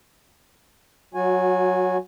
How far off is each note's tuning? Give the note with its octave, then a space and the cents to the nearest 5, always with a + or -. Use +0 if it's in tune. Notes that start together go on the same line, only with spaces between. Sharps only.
F#3 +0 F#4 -30 G#5 +0